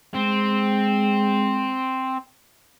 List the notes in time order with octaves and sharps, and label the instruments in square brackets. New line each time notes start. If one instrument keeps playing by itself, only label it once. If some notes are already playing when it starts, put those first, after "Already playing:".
[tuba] G#3 [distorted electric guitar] C4